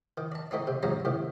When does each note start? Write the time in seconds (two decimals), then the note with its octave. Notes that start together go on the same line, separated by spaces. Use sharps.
0.18 D#3
0.32 D5 A5
0.51 D3 A3 C4 D#4 D5
0.67 C3
0.83 G#2 C3 F3 F#3 C#4 A#5
1.05 A2 C3 D#3